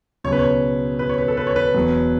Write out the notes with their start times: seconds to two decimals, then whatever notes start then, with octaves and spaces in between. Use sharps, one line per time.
0.24 C#2 B2 F#3 C#5
0.32 B4
0.39 C#5
0.99 B4
1.09 C#5
1.18 B4
1.28 A4
1.37 B4
1.47 C#5
1.56 B4
1.74 E1 E2 B2 F#3